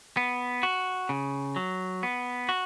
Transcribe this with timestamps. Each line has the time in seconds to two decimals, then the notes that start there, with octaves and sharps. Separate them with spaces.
0.17 B3
0.63 F#4
1.09 C#3
1.56 F#3
2.03 B3
2.49 F#4